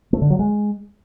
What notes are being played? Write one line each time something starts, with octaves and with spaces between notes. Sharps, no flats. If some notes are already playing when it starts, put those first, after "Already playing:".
A3
D3
F#3
G#3